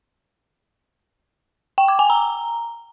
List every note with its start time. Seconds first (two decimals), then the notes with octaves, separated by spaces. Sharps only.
1.78 G5
1.88 D6
1.99 G#5
2.10 A#5